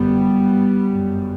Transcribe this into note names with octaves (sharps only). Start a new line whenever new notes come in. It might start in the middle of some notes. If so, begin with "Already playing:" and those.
Already playing: G1 F#2 G3 B3
G1 F#2